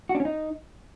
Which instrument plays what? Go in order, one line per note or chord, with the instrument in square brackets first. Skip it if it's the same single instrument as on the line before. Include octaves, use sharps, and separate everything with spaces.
[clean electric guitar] F#4
D4
C#4
D#4